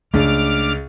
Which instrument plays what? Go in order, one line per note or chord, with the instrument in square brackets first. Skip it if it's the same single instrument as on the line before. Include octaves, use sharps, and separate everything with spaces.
[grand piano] C#2 [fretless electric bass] A3 D4 [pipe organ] D6 F6